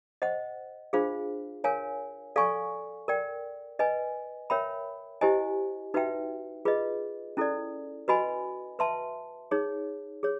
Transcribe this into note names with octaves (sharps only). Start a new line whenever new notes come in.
C5 D#5 F#5
D4 F4 G#4 C5 F5
A#4 C#5 F5 G#5
A4 D5 F5 G#5 C#6
A#4 D5 G5
B4 D#5 G#5
A#4 C#5 E5 G5 B5
E4 G4 C5 D#5 G#5
D#4 F#4 B4 E5 G5
F4 G#4 B4 D#5
C#4 E4 A4 D5
F#4 B4 D#5 G#5 B5
B4 E5 A5 C6
D#4 G#4 C#5
G#4 C#5